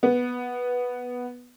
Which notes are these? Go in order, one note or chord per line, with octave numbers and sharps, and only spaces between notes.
B3